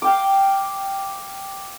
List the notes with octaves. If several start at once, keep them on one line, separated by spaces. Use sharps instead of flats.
F5 G5 D6